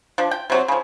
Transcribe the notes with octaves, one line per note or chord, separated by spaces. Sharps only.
F3 D4
G5
C3 F#3 C4
C#3 F3